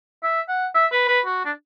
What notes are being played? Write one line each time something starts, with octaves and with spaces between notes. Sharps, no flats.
E5
F#5
E5
B4
B4
F#4
D4